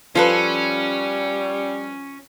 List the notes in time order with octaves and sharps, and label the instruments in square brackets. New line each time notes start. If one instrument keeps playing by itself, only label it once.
[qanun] F3 [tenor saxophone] G3 [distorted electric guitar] C#4 [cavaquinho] F4 A4 B4